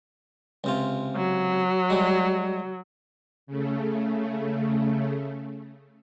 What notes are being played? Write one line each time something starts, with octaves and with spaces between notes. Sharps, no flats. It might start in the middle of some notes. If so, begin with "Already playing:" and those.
C#2 C3 F4
F#3
G3 G#3
C#3 A3